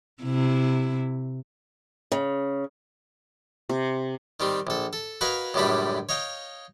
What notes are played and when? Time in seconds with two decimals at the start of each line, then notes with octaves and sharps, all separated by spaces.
0.23 C3 E4
2.12 C#3
3.69 C3
4.40 D#3 G3 C4
4.67 A#1 A4
4.93 A4
5.21 F#4 A#4 B4 D#5 F5 G#5
5.54 C#2 F#2 A2 G3 D4 B5
6.09 C#5 D#5 F5 G5